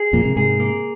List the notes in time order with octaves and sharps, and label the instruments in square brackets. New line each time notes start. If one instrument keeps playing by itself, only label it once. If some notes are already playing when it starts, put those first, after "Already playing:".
Already playing: [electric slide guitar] G#4
[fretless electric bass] F2 A#2 [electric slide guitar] A#3
[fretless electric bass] G#2 C3
[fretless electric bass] G#2 C3 [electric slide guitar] G#4
[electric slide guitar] A#3